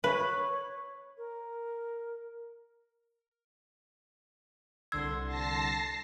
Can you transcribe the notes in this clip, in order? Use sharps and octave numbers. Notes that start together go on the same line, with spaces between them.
B4 C#5
A#4
C2 D3 C6 E6 G#6
A5 A#6 C7